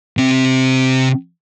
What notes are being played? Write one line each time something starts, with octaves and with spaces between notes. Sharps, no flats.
C3 C4